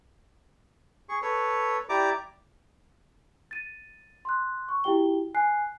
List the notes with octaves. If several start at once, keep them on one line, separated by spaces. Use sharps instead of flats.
G#4 C#6
A4 B4 C#5
E4 G4 D5 A#5 D6
A6 D#7
C6 F#6
C#6
E4 F#4 G4 G5 G7
G#5 F#6 C7